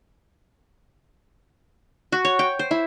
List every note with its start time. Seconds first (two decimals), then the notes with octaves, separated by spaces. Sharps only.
2.12 F#4
2.25 C#5
2.39 G5
2.59 C5
2.71 E4